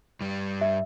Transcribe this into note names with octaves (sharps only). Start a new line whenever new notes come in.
G2 G3
E5